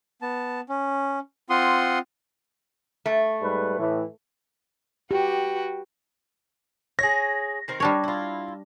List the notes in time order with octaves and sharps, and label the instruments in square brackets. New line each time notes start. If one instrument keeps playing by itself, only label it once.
[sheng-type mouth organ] B3 A5
C#4
C4 F4 F#5 C6 D#6
[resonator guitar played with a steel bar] A3
[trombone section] G#2 G3 B4
A2 E3
[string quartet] F#4 B4 G5 [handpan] G4
[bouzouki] G#4 C#5 [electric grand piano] A#6
[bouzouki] D#3 C4 A#4
[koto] G3 D4 C#5
[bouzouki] E4 F4